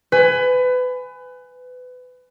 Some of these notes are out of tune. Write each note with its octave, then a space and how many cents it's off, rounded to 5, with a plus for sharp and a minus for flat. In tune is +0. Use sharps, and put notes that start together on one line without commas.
B4 +25 G#5 +0